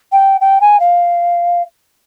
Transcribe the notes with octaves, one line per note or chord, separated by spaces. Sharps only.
G5
G5
G#5
F5